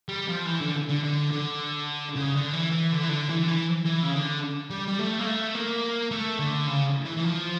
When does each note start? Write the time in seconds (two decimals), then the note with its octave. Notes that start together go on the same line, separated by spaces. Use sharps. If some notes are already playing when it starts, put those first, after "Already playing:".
0.08 G3
0.28 F3
0.46 E3
0.61 D3
0.89 D3
1.03 D3
1.31 D3
2.16 C#3
2.35 D3
2.53 E3
2.72 E3
2.92 D3
3.03 E3
3.09 D3
3.29 E3
3.44 D3
3.48 E3
3.85 E3
4.03 C#3
4.13 D3
4.70 G3
4.88 G3
4.99 A3
5.19 A#3
5.26 A3
5.55 A#3
6.11 A3
6.39 D3
6.67 C#3
7.05 E3
7.17 E3
7.24 F3